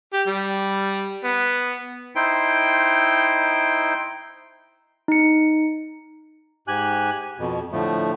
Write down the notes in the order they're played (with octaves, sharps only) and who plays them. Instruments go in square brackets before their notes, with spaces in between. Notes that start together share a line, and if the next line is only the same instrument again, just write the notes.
[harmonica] G4
G3
B3
[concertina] D#4 E4 C5 G5
[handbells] D#4 C#7
[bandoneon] G#2 G4 G#5 F#6
F2 B2
A2 D3 F3 A3